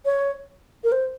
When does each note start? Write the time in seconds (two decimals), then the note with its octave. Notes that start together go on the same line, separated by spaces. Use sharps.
0.05 C#5
0.84 A#4
0.92 C5